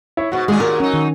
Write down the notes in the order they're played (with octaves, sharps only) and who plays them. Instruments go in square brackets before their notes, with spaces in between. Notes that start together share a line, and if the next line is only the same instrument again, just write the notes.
[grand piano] E4 C#5
[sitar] G#2 B2 [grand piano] F#4
[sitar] D#2 A#2 G#4 [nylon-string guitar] G#3
[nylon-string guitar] A#4
[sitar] F#3 D#4 [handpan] C#4
[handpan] D#3